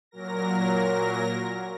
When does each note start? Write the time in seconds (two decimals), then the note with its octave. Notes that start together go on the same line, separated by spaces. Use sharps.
0.11 A#2 F#3 A#4 A#6